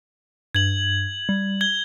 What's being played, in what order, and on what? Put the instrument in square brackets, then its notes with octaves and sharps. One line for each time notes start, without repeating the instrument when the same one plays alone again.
[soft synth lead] G2 [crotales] G#6 F#7
[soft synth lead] G3
[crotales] G#6 G7